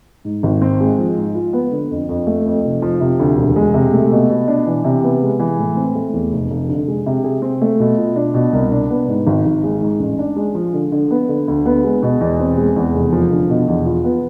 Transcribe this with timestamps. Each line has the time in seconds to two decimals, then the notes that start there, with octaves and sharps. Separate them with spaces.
0.25 G#2
0.43 G#1
0.62 C4
0.81 G#3
0.99 F3
1.17 G#2
1.35 F4
1.53 B3
1.72 D3
1.91 F2
2.09 F2
2.27 A3
2.46 F2
2.65 F1
2.82 F3
3.01 C3
3.19 D2
3.38 E1
3.56 G#3
3.74 C3
3.93 A3
4.11 B2
4.30 B2
4.48 D4
4.67 E3
4.84 C3
5.03 B3
5.21 G#3
5.40 E3
5.59 A2
5.76 C4
5.95 A3
6.13 E2
6.32 F1
6.51 F1
6.69 D3
6.88 G#3
7.06 C3
7.24 G#4
7.42 C4
7.61 A3
7.80 B2
7.98 F4
8.16 D4
8.34 B2
8.53 C2
8.72 D4
8.90 B3
9.08 G#2
9.27 G#1
9.45 G#1
9.64 G#3
9.81 G#2
9.99 A1
10.19 D4
10.36 G#3
10.55 F3
10.73 D3
10.92 D3
11.11 B3
11.29 D3
11.48 D2
11.66 B3
11.84 G#3
12.03 B2
12.21 E2
12.40 C4
12.58 G#3
12.76 E2
12.94 F1
13.13 F3
13.31 D3
13.50 B2
13.68 E2
13.86 F4
14.04 B3